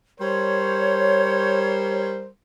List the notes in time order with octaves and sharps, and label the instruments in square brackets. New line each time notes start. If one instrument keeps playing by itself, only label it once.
[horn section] G3 A#4 C5 [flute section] C#5